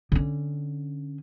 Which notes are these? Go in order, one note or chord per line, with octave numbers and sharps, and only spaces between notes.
D3 C#4